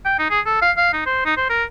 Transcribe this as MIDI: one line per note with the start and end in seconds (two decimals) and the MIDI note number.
0.05 0.16 79
0.19 0.28 63
0.30 0.40 68
0.46 0.60 69
0.62 0.72 77
0.77 0.92 77
0.93 1.05 63
1.06 1.22 72
1.25 1.35 63
1.37 1.47 72
1.50 1.64 70